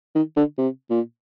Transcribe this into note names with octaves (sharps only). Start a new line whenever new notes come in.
D#3
D3
C3
A#2